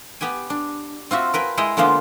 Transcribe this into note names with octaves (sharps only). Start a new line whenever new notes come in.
B3 G4 G5 G#5
D4
C4 F4 F#4 E5
A#4 B4 G5 G#5
G#3 E4 D#5 G5
D3 G#3 A#3 B3 F4 C5